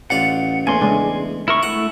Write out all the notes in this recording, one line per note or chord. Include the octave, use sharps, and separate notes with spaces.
A1 F4 D5 F#5
E2 A3 A#3 C#4 G#5 C6
C#3 G#3 D4
E4 A#4 C#6
A3 E4 E5 F#5